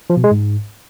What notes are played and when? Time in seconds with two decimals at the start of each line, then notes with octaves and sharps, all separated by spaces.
0.10 F3
0.17 B2
0.24 G#3
0.31 G#2